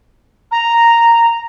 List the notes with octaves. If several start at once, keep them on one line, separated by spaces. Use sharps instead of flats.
A#5